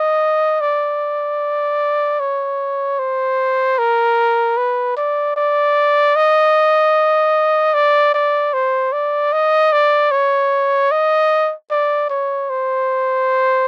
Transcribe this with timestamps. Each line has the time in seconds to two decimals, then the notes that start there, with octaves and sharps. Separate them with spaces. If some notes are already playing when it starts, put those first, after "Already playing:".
Already playing: D#5
0.61 D5
2.20 C#5
2.99 C5
3.79 A#4
4.57 B4
4.97 D5
5.37 D5
6.16 D#5
7.74 D5
8.14 D5
8.53 C5
8.93 D5
9.33 D#5
9.73 D5
10.11 C#5
10.92 D#5
11.71 D5
12.10 C#5
12.50 C5